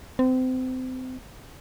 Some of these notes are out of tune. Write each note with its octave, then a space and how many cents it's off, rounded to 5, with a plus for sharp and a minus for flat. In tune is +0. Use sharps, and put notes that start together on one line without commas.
C4 -30